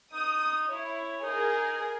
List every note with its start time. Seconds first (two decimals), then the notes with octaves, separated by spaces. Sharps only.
0.12 D#4 D#6
0.69 E4 C#5
1.24 D#4 G#4 A#4